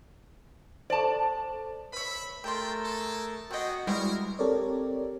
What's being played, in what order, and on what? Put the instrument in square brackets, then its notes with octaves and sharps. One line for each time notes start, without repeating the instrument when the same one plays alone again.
[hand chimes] A4 C5 [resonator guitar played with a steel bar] D5 A5
[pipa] B4 C#5 [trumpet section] E5 B5
[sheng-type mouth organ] A3 A#4 E6 [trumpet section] F4 D5 G5 [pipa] G4 C6
[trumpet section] G#4 A4
[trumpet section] B3 G#4 G5 [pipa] C4 D#5 [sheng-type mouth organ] F#4 F#5
[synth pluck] G3 G#3 [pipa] B3 C4 [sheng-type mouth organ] E4 F#4 [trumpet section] A#4
[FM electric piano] C4 G4 A4 A#4 C#5 D5